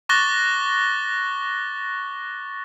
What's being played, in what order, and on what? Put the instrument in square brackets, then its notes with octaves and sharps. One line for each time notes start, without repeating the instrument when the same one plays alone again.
[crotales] C#6 D6 F#6 A6 A#6 G7